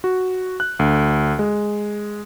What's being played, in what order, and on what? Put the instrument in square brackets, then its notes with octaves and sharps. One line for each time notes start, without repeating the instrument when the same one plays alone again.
[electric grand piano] F#4
F#6
D2
G#3